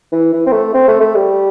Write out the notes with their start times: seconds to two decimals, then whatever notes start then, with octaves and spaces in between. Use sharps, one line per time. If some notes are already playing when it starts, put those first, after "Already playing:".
0.12 E3
0.33 E3
0.46 C4
0.52 A3
0.74 C4
0.88 A3
1.00 A3
1.15 G3